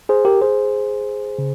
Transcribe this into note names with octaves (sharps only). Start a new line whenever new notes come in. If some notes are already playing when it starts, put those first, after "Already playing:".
G#4 C5
G4 A#4
G#4 C5
C#3